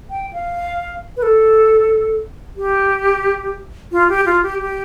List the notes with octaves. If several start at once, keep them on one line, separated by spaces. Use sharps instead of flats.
G5
F5
B4
A4
G4
F4
G4
F4
G4
G4